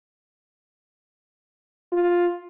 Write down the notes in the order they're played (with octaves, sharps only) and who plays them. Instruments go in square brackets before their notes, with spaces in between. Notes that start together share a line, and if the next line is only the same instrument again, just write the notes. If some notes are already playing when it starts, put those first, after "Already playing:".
[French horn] F4